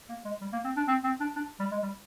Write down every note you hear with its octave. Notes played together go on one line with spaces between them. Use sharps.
A#3
G#3
G3
A#3
C4
D4
C4
C4
D4
D4
G3
G#3
G3